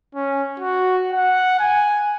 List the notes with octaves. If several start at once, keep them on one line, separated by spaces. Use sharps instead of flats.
C#4
F#4
F#5
G#5